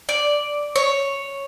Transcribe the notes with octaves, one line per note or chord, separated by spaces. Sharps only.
D5
C#5